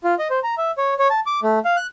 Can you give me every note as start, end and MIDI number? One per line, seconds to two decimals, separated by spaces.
0.04 0.15 65
0.19 0.28 75
0.30 0.39 72
0.43 0.55 82
0.58 0.71 76
0.78 0.94 73
0.99 1.08 73
1.10 1.20 81
1.26 1.40 86
1.43 1.59 57
1.65 1.76 77
1.77 1.87 90